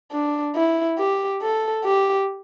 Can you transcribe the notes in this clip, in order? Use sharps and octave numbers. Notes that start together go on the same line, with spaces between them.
D4
E4
G4
A4
G4